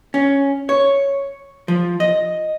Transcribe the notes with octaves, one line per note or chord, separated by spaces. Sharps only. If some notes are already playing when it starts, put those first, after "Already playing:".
C#4
C#5
F3
D#5